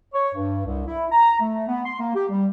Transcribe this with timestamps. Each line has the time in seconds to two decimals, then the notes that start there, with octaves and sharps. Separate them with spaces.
0.14 C#5
0.35 G2
0.66 C2
0.87 E4
1.12 A#5
1.41 A3
1.68 B3
1.85 C6
2.00 A#3
2.15 G4
2.29 G3